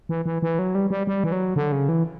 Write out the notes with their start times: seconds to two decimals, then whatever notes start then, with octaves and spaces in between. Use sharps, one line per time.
0.09 E3
0.26 E3
0.42 E3
0.59 F#3
0.75 G3
0.91 G3
1.07 G3
1.24 E3
1.32 F#3
1.56 D3
1.72 C#3
1.89 E3